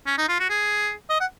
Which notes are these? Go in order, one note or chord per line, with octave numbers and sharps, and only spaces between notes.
C#4
D#4
F4
F#4
G#4
D#5
F#5